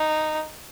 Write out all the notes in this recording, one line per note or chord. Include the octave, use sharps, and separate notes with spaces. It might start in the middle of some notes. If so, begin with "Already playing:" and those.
Already playing: D#4